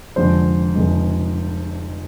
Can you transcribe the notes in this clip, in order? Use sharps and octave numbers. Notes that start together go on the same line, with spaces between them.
F1 F2 D3 G#3 C5
F1 F2 D3 G#3